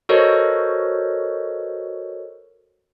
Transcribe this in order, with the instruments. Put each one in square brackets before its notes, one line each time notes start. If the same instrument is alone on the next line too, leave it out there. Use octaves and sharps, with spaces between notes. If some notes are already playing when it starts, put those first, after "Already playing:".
[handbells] F#4 A4 A#4 C5 C#5 D#5